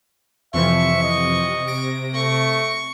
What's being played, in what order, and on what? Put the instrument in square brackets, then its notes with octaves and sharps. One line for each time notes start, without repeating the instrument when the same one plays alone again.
[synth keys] F2 E3 F3 [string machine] C3 [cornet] E5 [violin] C#6
[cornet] D#5
[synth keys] A#6 D7
[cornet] A3 [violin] C#6